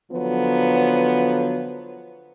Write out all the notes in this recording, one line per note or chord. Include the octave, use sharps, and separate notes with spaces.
D3 F3 F#3 B3